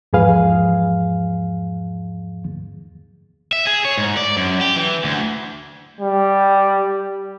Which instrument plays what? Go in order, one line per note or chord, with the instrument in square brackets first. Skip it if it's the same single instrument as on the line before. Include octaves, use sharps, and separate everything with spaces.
[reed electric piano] E2 G#2 F3 G#4 B4 F5
[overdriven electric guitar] E5
G#4
C#5
G#2
D5
F#2
G4
E3
D2
[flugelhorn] G3